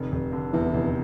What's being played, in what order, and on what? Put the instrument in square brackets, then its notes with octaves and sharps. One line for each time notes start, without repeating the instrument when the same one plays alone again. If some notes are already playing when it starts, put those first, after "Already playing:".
Already playing: [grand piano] F1
F1
D3
[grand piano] E2 [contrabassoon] E3
[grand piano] F1